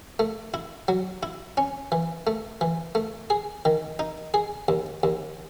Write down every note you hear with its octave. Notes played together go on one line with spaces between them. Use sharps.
A3
E4
F#3
E4
C#4
E3
A3
E3
A3
G#4
D#3
D#4
G#4
D#2
D#2